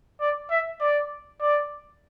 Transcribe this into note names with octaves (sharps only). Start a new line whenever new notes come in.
D5
E5
D5
D5